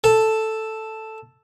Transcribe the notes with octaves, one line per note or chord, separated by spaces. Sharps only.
A4